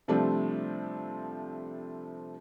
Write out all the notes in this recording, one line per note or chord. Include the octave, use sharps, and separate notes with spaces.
C3 F3 G3 A3 C4 D4